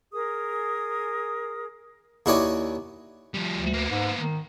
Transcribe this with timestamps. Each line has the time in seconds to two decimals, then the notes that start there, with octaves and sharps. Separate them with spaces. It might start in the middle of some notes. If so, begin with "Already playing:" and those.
0.12 G#4 A#4 D#6
2.26 D#2 E4 F#4 C#5 D5 G#5
3.34 F3 G3
3.55 D2
3.74 A#3 B3
3.90 G#2
4.19 D#3